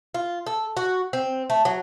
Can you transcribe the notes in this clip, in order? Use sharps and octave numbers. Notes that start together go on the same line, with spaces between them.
F4
A4
F#4
C4
A3
F#3